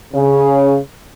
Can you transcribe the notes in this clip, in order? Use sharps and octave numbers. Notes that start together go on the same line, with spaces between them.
C#3